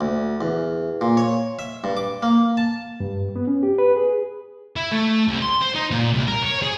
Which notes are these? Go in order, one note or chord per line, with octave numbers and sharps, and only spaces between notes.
D2
E2
A#2
C#5
E5
G2
D6
A#3
A5
G2
B3
C#4
G4
B4
G#4
E4
A3
C2
C6
C5
D#4
A#2
C2
A#4
C#5
G#4